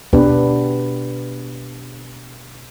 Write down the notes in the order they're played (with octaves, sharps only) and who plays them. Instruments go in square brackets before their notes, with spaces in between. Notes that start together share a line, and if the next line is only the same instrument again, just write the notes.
[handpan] B2 B3 D4 G4 B4